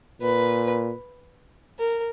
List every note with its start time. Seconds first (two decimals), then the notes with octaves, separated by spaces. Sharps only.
0.21 A#2 B4
1.79 A#4